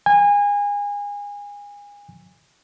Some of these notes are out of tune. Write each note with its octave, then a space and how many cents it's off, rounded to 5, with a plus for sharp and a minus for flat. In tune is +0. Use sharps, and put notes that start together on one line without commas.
G#5 -25